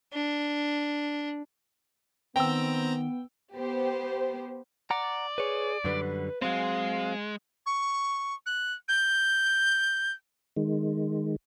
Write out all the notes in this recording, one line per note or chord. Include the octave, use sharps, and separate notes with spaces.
D4
D#3 B3 C4 G5 A#5 E6
B3 G4 C5
D5 F#5 A#5
G#4 B4 C#5
F#2 D3 G3 B4
F#3 G#3 C4 F5
C#6
F#6
G6
D#3 G#3